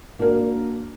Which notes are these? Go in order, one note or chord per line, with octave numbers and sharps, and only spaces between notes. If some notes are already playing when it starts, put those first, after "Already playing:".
A#3 D4 F#4 A#4